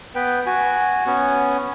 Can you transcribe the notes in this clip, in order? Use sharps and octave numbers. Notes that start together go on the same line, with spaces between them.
B3 B4 G5
F#4 G#5
B3 C#4 G#5